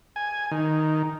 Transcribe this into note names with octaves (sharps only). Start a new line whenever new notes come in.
G#5
D#3